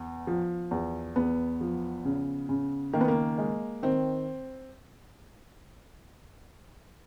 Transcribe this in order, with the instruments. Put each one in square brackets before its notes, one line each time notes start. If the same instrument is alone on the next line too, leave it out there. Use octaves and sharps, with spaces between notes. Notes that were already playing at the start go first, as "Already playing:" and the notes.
Already playing: [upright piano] E2 [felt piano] B3
[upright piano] F3
E2
[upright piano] E2 [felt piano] B3
[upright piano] F3
C#3
C#3
[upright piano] D#3 [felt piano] A#3
[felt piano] B3
A#3
[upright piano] G#3
[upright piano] D#3 [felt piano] C4